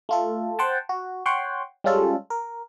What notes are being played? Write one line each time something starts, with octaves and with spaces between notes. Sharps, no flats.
A3 F4 A4
C5 F#5 G5 A5
F#4
C#5 F#5 G5 C6
G3 G#3 C#4 F4 A4
A#4